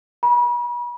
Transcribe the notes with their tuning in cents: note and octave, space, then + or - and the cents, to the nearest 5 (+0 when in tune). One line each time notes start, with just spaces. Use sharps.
B5 -40